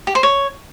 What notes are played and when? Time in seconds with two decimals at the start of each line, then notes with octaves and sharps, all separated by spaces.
0.07 G4
0.15 C5
0.23 C#5